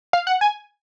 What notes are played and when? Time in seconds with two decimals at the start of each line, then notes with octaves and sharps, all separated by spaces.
0.13 F5
0.27 F#5
0.41 G#5